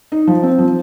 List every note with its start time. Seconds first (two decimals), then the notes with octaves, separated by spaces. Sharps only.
0.12 D#4
0.27 F3
0.43 C4
0.59 F3